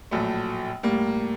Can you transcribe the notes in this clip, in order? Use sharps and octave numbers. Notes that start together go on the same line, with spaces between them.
A#1 A2 F#3 A3
A2 G3 A#3